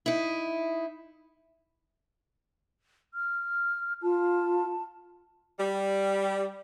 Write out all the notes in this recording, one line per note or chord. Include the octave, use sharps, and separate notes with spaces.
D#4 E4
F6
F4 A5
G3